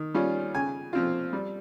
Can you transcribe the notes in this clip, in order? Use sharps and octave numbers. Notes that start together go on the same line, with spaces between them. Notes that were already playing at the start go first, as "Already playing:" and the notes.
Already playing: D#3
G3 C#4 F4
C#3 G#5
F3 C4 F4
G3